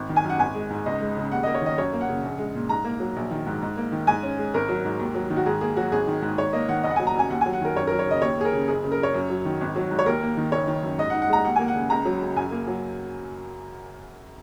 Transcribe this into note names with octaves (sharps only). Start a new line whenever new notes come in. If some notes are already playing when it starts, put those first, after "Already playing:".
Already playing: G#1
D#3
G#5
F#2
F#5
G#1 G#5
G#3
G#2
C#2 D#5
G#3
C#3
D#2 F#5
D#5
A#3
C#5
D#3 D#5
F#2 C#5
A#3
F#5
C#3
A#1
G#3
A#2
G#2 A#5
A#3
F#3
A#1
D#3
G#2
G#2
A#3
D#3
G#2 G#5
C#4
G#3
G#1 A#4
F#3
G#2
D#2
F#3
D#3
F#4
G#2 G#4
A#3 G#4
F#3 F#4
G#1 G#4
D#3
G#2
G#2 C#5
A#3 D#5
D#3 F#5
F#1 D#5
F#5
G#5
F#3
A#5
F#2 G#5
D#2 F#5
G#5
F#3
F#5
D#3 A#4
F#2 C#5
A#4
F#3
C#5
C#3 D#5
D#2 C#5
A#3 G#4
A#4
C#3
F#1 G#4
C#3
A#4
F#2 C#5
F#2
F#3
D#3
G#1
F#3
G#2
C#5
D#2 A#4
A#3
D#3
F#1 C#5
D#3
F#2
G#2 D#5
F#5
D#4
F#5
G#3 A#5
D#2 F#5
G#5
A#3
F#5
C#3
C#2 A#5
F#3
C#3
F#2 G#5
A#3
F#3